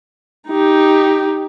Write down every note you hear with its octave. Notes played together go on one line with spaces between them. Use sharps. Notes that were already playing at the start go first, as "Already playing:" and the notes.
D#4 G4